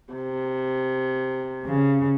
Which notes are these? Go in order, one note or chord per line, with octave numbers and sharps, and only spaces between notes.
C3
C#3